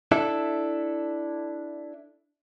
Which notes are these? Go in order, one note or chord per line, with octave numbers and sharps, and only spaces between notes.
D4 E4 A4 E5